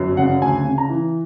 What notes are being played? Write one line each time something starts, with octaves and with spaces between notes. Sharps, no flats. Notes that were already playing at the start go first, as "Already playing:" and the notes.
Already playing: G1 F#2
C#3 F#5
D2 G#5
C#3
A#5
E3